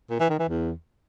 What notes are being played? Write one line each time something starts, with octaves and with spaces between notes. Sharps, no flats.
A#2
E3
D#3
E3
E2